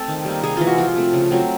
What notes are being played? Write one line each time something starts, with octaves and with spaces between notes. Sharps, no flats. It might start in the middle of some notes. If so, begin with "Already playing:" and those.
Already playing: A3 C4 A4
D#3
G3 A#3
C3 G#4
E3 G#3 F4
F#4
F3 F4
A3 C4
C#3
F#3 A3 C4